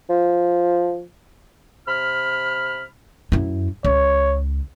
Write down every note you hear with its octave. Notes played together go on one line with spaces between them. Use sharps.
F3
C3 B5 F6
F#2 E4
C#2 C#5